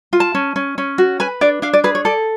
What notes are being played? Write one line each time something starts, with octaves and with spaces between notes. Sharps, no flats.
F4
A5
C#4
C#4
C#4
F#4
B4 G#5
D4 D5
D4 F5
D5
G#4 B4
C#5
A4 D5